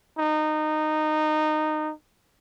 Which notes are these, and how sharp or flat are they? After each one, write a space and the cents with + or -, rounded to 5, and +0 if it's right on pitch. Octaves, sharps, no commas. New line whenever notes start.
D#4 -20